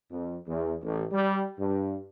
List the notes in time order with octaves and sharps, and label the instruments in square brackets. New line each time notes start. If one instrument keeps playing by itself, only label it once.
[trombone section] F2
E2
A1
G3
G2